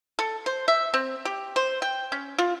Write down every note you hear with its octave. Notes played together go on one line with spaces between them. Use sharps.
A4
C5
E5
C4
G4
C5
G5
C#4
F4